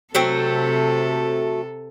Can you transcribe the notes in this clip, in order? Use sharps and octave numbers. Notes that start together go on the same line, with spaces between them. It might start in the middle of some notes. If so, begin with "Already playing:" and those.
C3 F#3 A3 C4 A4